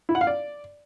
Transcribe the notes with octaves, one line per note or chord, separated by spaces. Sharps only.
E4
F#5
F5
D5